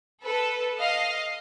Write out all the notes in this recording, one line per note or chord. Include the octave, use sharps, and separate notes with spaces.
A4 B4
D#5 F5